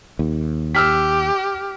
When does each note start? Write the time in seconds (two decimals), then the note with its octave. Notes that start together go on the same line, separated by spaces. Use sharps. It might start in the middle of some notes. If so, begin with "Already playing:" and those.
0.19 D#2
0.75 G4 E6 F6 B6